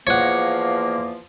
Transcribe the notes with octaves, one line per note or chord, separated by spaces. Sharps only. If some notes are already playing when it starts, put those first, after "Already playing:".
E2 F3 A#3 C#5 F#5